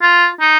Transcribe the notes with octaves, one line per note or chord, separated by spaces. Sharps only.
F4
D#4